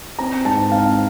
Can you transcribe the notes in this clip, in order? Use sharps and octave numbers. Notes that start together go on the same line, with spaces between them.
C4 A#5
G#2 A5
C4 F5